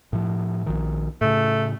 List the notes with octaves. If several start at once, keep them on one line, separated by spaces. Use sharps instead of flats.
A2 F3
A#1 D#3
A2 C#3 A3